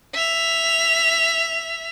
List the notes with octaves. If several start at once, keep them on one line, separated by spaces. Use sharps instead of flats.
E5 F7